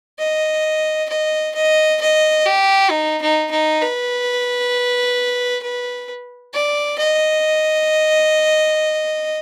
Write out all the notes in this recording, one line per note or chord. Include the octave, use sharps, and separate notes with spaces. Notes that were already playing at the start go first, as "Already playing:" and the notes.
D#5
D#5
D#5
D#5
G4
D#4
D#4
D#4
B4
B4
D5
D#5